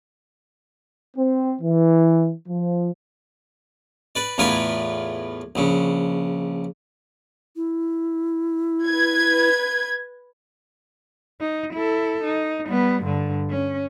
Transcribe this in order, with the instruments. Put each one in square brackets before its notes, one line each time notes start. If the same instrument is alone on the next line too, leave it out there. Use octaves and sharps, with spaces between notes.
[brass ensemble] C4
E3
F3
[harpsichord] B4 D5
E2 A2 F4 A#4 B4 G#5
A#1 C#3
[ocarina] E4
[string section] B4 G#6
[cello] D#4
E4 A4
D#4
G3 B3
G2 D3
C#4